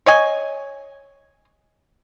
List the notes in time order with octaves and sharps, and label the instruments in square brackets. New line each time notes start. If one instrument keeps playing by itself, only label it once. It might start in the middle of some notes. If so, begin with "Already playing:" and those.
[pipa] C#5 D#5 G#5